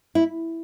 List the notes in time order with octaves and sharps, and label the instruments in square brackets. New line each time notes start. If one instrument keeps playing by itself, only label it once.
[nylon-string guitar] E4